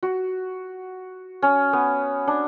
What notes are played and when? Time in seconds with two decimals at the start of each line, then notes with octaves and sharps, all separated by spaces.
0.03 F#4
1.42 C#4
1.73 B3
2.27 D4